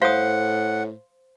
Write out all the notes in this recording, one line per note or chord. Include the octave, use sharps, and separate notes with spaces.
A2 C5 F5 F#5 D#6